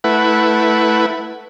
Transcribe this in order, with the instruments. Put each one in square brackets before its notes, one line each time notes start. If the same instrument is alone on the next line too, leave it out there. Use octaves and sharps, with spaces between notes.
[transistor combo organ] A3 E4 B4 F#5